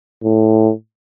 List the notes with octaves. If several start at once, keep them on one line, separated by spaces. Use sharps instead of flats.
A2